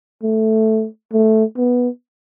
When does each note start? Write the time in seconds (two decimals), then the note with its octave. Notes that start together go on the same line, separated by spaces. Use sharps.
0.23 A3
1.13 A3
1.57 B3